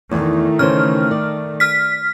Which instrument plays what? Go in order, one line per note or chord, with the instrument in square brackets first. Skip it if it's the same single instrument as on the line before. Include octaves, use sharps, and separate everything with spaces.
[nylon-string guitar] E2 [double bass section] D#3 A3
[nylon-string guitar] C#3 E3 C5 [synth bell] F6
[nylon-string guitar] D5
[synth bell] F6 B6